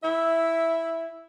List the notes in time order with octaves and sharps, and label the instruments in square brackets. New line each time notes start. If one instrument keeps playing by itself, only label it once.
[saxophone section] E4 E5